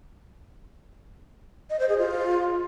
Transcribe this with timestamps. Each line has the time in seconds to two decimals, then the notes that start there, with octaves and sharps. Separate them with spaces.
1.70 D#5
1.79 C5
1.89 G#4
1.98 F4